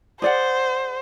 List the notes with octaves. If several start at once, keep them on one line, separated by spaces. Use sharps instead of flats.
G#4 C5 D5 F#5